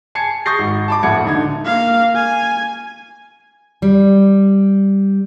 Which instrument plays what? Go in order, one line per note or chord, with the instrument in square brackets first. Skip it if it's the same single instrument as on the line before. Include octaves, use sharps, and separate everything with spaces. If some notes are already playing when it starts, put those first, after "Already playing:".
[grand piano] G#5 A5 G#6 C7 C#7
C#6 D#6 G6 A6 A#6 C7
G#1
A5 B5 D6
D1 F2 A3 F#5 G#6 C#7
D3 D#4 G#6
[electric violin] A#3 F5
G#5
[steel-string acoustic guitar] G3